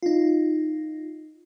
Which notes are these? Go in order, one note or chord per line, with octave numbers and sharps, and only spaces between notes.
D#4 F4